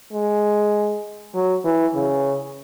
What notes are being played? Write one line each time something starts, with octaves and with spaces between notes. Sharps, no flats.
G#3
F#3
E3
C#3